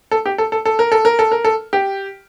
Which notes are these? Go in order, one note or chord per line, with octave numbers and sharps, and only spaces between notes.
A4
G4
A4
A4
A4
A#4
A4
A#4
A4
A#4
A4
G4